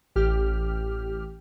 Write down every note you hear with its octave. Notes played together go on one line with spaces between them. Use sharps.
A1 G4 F6